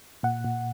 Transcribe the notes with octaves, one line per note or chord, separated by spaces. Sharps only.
A#2 F#5
A#2